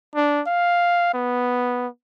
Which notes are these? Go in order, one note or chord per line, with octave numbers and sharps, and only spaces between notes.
D4
F5
B3